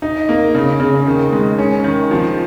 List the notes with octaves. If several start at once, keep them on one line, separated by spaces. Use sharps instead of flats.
D#4
A#3
C#3
C#3
D#3
G#3
C#4
D#3
F3